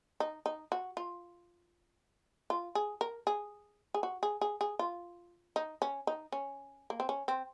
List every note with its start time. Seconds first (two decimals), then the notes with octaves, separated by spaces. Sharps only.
0.20 D#4
0.46 D#4
0.72 F#4
0.97 F4
2.50 F4
2.75 G#4
3.01 A#4
3.27 G#4
3.94 G#4
4.03 F#4
4.23 G#4
4.41 G#4
4.61 G#4
4.79 F4
5.56 D#4
5.82 C#4
6.07 D#4
6.32 C#4
6.90 A#3
7.00 C4
7.09 C#4
7.28 C4